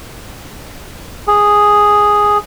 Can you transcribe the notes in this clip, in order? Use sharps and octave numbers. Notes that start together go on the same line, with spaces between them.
G#4